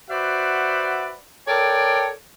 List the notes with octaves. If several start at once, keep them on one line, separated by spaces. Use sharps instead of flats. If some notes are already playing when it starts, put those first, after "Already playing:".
F#4 B4 C5 D5 E5 F#5
A4 A#4 C#5 D5 G5